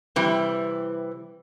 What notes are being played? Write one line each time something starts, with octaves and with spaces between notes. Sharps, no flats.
C3 E3 G3